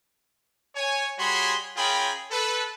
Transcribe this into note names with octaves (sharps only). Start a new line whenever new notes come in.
C#5 G#5
G3 F#4 G#4 C#5 B5 C6
C#4 F4 G#4 A#4 G5 B5
A4 B4